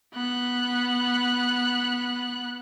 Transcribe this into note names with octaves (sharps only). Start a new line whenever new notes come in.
B3 F#6